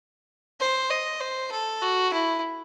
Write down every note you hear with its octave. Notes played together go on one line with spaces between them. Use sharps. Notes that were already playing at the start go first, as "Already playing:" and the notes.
C5
D#5
C5
A4
F#4
E4